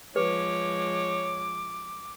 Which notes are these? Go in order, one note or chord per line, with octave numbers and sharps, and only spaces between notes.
F3 G#3 B4 C#5 D6